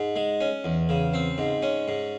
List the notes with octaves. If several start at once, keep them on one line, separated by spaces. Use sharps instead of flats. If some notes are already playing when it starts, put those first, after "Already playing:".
Already playing: G#2
G#3
C#4
E2
C#3
C4
G#2
C#4
G#2